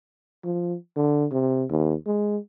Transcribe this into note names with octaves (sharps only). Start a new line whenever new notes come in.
F3
D3
C3
D#2
G#3